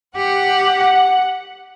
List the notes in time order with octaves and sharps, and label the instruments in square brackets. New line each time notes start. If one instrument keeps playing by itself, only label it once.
[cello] G4 [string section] F#5